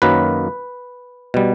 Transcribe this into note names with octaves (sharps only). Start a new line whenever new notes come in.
F#2 D#3 F#3 A#3 B4
B2 G3